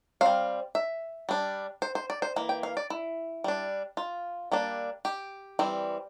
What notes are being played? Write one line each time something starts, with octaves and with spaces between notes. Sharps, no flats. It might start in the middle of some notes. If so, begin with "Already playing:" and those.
G3 C4 F5
E5
G3 D4
C5
C5
D5
C5
E3 A#3
G5
F5
D5
E4
G3 D4
F4
G3 A#3 D4
G4
E3 G3 C4